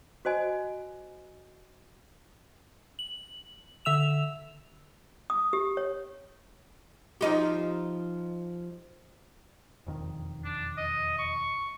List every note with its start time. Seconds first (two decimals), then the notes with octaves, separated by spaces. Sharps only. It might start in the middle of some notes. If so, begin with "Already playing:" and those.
0.25 F#4 C5 D#5 G#5
2.99 F#7
3.85 D3 E5 E6 E7 F7
5.30 D#6
5.53 G4
5.77 C#5
7.21 F3 D#4 G4
9.87 E1 F2 D#3
10.45 D4
10.78 D#5
11.19 C#6